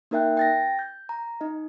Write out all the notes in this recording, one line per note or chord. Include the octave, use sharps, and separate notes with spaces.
A#3 D#4 A#4 E5 G5 F#6
G5 A6 A#6
G6
A#5
D#4 D#5